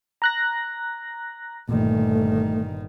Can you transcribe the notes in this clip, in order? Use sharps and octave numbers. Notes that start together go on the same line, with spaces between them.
A#5 F#6 A#6
G1 A#2 D#3 A3